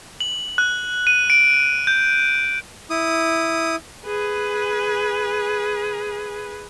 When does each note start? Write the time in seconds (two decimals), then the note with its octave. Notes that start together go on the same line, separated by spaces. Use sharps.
0.20 F#7
0.58 F#6
1.07 D#7
1.30 D7
1.87 G6
2.90 E4 D#6
4.05 G#4 B4